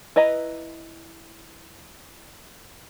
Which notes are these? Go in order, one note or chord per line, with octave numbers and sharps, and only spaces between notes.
E4 B4 D#5 A#5